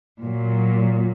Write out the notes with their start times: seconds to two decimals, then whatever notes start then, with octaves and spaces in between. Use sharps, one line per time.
0.22 A#2 F#3